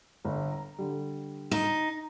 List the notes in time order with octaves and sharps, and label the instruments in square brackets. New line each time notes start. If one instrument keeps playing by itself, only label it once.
[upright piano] G1
A#5
D3 G3
[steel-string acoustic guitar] D#4